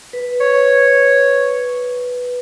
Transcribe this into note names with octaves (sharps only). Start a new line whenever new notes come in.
B4
C#5